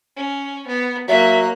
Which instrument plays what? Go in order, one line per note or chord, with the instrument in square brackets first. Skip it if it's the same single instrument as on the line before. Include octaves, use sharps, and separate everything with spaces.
[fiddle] C#4
B3
[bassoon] F#3 [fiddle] A#3 F#6 [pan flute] E5